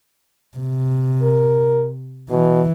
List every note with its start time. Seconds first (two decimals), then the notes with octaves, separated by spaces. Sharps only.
0.58 C3
1.22 A#4
2.30 B2 E3